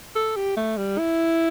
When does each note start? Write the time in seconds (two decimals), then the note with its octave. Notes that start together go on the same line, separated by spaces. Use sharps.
0.16 A4
0.36 G4
0.56 A3
0.78 G3
0.98 E4